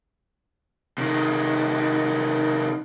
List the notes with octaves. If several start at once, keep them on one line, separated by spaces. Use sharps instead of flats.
C3 D#3